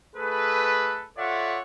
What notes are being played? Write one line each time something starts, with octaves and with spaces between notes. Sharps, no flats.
A3 G#4 A4 B4
F4 A4 C#5 D5 E5 F#5